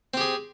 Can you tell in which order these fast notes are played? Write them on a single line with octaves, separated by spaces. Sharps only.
C4 G4 G#4